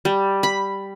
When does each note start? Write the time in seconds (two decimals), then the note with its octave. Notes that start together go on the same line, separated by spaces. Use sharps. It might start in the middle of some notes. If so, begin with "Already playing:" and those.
0.05 G3
0.43 B5